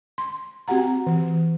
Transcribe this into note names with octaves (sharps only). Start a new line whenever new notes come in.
C6
C4 F#4 G4 F#5 A#5
E3